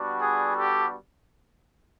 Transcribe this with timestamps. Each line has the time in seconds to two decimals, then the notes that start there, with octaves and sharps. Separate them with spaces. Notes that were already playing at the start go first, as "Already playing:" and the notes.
Already playing: G3 B3 D4 F#4
0.21 G#4
0.56 G4 A4